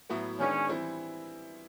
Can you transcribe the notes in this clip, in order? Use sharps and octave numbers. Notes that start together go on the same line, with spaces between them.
A2 F#3 B3 E4
D#3 G#3 B3 C#4 D4
E3 G3 C4 E4